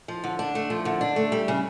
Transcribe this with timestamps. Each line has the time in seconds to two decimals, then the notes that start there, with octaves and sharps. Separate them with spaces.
0.08 F3
0.24 D3
0.39 D4
0.55 A3
0.70 F3
0.85 D3
1.01 D4
1.16 A3
1.32 G3
1.48 C#3